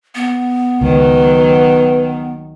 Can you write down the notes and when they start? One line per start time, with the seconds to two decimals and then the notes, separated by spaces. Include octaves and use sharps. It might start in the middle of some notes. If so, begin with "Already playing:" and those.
0.15 B3
0.81 C#2 D#3 F#3 B4